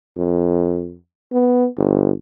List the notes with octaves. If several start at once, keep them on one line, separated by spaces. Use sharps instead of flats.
F2
B3
G1